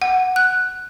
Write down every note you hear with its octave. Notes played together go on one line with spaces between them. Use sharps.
F#5
F#6